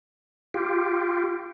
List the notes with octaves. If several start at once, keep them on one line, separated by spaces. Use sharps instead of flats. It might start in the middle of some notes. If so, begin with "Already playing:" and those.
F4 G4